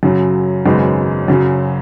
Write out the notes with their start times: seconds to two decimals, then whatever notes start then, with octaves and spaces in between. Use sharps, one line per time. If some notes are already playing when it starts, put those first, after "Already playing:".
0.03 F#2 C#3 F#3
0.65 G#1 F#2 C#3 G#3 B3
1.28 F#2 C#3 F#3